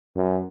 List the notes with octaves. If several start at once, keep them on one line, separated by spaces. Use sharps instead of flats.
F#2